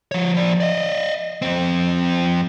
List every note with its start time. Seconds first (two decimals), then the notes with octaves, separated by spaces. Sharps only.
0.12 F3 C#5
0.34 F3 D5
0.60 D5 D#5
1.42 F2 C4